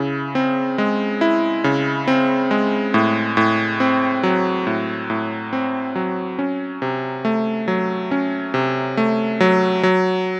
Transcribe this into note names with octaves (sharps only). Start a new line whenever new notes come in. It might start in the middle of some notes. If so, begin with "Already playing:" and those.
Already playing: C#3 E4
C4
G#3
E4
C#3
C4
G#3
A2
A2
C4
F#3
A2
A2
C4
F#3
C#4
C3
A3
F#3
C#4
C3
A3
F#3
F#3